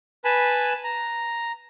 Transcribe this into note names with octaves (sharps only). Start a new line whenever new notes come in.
B4 G#5 A5 B5
A#5